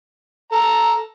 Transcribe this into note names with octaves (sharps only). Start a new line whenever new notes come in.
A4 A#5